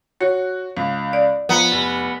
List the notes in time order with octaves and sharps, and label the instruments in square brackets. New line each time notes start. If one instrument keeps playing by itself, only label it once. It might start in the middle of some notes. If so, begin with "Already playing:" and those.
[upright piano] F#4 [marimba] C#5
[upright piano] C#2
[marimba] D5
[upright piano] F3 A#5 [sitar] B3
[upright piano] F1